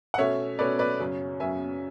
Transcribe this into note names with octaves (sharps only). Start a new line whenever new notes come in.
F#5
B2 A3 C#4 C#5 E5
B2 A3 C#4 B4 D5
B4 D5
F#2 C#3 F#3
F#2 C#3 F#3 E5 G#5